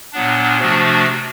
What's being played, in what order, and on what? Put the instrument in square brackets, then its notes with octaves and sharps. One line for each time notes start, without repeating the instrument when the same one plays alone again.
[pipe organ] A#2 F#3 B3 D4
C3 F3 A3 D4 F#4